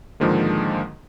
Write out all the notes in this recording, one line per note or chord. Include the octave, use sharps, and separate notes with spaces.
G#2 D3 D#3 F3 G#3 A#3